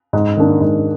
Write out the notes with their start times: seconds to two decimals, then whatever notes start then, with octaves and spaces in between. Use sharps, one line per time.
0.13 G#2
0.37 D#3 A#3 D4
0.61 G#2